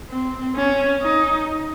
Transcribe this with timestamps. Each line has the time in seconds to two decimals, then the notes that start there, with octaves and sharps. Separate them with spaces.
0.09 C4
0.56 C#4
1.03 D#4